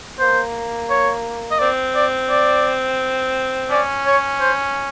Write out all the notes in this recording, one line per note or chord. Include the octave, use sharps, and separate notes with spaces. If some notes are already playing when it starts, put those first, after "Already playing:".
A#3 C5
C#5
D#5
C4 D5
D5
D5
C#4 D5
C#5
C5